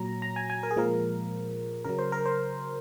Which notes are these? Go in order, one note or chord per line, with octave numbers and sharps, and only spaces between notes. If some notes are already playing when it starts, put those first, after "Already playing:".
Already playing: A#2 F#3 A#5
A#5
G#5
G#5
A#4
G#4
A#2 F3 G#3 A#4
C#3 F#3 A#4
C5
A#4
C5